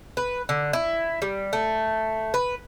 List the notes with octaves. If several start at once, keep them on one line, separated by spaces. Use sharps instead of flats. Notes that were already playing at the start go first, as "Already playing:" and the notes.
B4
D3
E4
G3
A3
B4